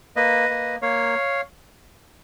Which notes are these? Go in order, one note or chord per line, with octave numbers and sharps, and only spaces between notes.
A#3 B4 D#5
A#3
A#3 C#5 F5